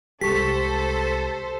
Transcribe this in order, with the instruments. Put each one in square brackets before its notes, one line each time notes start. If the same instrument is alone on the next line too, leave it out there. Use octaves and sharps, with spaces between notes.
[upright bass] C2 G#3 [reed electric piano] G4 C#6 [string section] A4 C5 [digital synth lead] B6